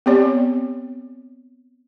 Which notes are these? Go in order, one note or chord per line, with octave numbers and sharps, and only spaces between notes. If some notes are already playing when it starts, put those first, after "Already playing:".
B3 C4 G4 C#5 D5